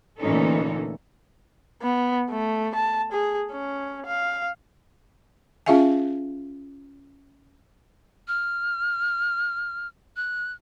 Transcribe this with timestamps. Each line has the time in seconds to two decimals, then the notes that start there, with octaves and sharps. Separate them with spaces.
0.19 D2 A#2 E3 C#4 D#4 A4
1.82 B3
2.30 A3
2.75 A5
3.12 G#4
3.51 C#4
4.06 F5
5.66 C#4 F4 G#4 E5 F5 G#5
8.27 F6
10.16 F#6